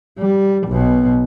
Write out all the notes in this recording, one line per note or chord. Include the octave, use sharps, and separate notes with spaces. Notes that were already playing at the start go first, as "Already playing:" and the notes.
G3
B1 B2